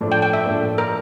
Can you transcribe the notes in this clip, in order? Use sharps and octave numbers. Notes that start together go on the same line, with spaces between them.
A2 F3 A3 D4
G5
G5
E5
A2 F3 A3 D4
A#4